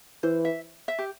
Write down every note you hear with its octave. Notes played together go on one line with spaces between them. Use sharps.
E3 C5
E5
E5
G4